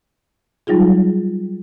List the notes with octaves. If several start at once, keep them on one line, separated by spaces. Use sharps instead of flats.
F#3 G3 D#4 F4 G#4